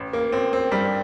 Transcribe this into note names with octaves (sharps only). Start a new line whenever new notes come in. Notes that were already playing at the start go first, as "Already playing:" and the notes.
Already playing: A1
A#3
A1 C4
C4
G2 G3